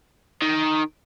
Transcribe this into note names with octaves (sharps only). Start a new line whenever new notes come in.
D#3